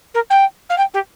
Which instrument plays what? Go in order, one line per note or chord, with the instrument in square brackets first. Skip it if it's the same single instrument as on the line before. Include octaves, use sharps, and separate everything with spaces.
[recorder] A#4
G5
F5
G5
G4